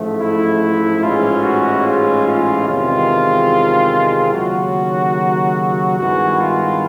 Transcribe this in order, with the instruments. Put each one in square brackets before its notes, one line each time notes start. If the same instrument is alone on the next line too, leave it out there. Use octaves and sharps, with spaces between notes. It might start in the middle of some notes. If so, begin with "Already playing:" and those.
Already playing: [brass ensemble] A1 G#2 F3 A3
[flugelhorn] E4
[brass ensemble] A1 G#2 E3 G#3 C#4 [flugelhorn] F4
[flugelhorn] F#4
F4
F4
[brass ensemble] E2 C3 D#3 G#3 C4 [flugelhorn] F4
[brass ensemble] D#2 C#3 F#3 [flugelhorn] F#4
[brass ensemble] G2 D#3 G#3 B3 E4 [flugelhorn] F#4
[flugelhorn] F4